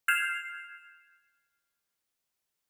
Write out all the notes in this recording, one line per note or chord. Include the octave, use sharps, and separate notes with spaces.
F6 G6 G#6 C7 E7 F7